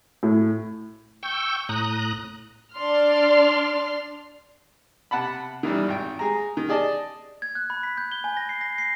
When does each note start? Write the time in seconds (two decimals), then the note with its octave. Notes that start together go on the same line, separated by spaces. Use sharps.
0.23 A2
1.23 G5 C#6 E6 G6
1.69 A2 A#5 D#6 F#6
2.74 D4 D5 C6 F6
5.11 C3 F#5 A5 B5
5.63 D#3 E3 G3
5.88 G#1 G5
6.19 G#3 G#4 A#5
6.57 D#3
6.69 G#4 D5 D#5 A5
7.42 G#6
7.55 F#6
7.70 B5
7.83 B6
7.98 G6
8.12 G7
8.24 G#5
8.37 A#6
8.49 C7
8.61 A#6
8.78 C7